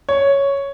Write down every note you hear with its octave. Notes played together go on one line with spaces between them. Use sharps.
C#5